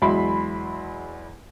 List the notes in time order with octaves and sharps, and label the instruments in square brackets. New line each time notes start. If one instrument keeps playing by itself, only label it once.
[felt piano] E2 F#3 G#3 E5 B5 C6